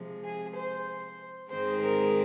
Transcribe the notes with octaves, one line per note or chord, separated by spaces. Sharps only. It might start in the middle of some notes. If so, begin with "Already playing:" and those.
Already playing: C3 F3 G#3
G#4
C5
G#2 D#3 G#3 C4 C5
A#4